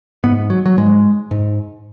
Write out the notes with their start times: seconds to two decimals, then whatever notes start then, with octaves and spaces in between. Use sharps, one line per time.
0.24 G#2 B3
0.50 F#3
0.66 F#3
0.78 G#2 G#3
1.31 G#2